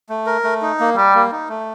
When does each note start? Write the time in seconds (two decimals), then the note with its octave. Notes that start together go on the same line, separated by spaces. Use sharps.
0.09 A3
0.26 A#4
0.44 A3
0.62 D#4
0.80 A#3
0.96 G3 G4
1.14 A#3
1.32 D#4
1.49 A3